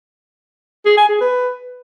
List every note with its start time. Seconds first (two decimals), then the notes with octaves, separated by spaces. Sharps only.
0.85 G#4
0.97 G#5
1.09 G#4
1.21 B4